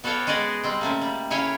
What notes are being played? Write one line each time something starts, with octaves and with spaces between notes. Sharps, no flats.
B3 F#4 A4 C#5 F5 G5
G#3 F#4 G#4 D5 D#5
G3 G#3 C4
C#3 A3 A#3
G3
C#3 E4 C#5 F5 G5 G#5